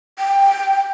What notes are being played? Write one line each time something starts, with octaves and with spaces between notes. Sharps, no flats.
G5